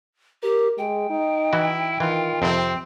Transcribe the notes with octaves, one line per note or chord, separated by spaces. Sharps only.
G4 A#4
G#3 G5
D#4
E3 E4 F#4
D#3 E3 F4
F2 C3 C4